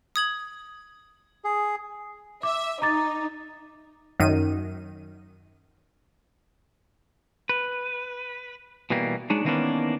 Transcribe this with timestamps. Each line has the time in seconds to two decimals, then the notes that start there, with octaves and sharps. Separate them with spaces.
0.16 D#6 G#6 F#7
1.44 G#4
2.43 E5 D6
2.82 D#4 A#5 D6 A6
4.20 F#2 D#3 D#7
7.49 B4
8.90 B2 E3 G3 A#3
9.30 G#3 D4 D#4 C#5
9.45 D#3 E3 A#3 B3 C#4 D4